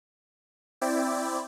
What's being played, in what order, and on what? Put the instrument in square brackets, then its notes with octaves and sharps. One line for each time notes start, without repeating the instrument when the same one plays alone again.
[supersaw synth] C4 E4 D5 G5